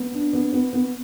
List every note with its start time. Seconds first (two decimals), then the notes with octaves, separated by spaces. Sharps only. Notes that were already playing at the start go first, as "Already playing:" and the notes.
Already playing: B3
0.13 D4
0.33 B3
0.52 B3
0.73 B3